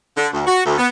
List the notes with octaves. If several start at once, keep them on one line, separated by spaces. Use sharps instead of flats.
D3
D2
F#4
D2
B3